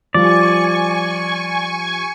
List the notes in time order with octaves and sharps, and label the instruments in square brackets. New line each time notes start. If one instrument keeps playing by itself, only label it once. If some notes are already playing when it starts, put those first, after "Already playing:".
[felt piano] F3 G3 F4 [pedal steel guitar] D5 [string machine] G#5 C#6